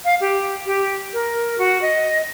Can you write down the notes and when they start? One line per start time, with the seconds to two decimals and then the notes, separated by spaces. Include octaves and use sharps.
0.05 F5
0.21 G4
0.66 G4
1.13 A#4
1.58 F#4
1.82 D#5